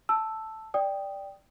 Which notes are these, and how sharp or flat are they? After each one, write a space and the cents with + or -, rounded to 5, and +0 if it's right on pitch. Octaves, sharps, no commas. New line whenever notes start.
A5 +0 E6 +0
D5 +0 G5 +5 D#6 +0